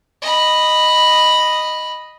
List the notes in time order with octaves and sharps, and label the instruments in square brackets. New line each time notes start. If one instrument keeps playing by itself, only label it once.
[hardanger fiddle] D#5 B5